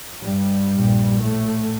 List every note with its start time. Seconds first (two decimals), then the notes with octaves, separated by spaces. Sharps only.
0.22 G2 G3
0.72 A#1 A#2
1.22 A2 A3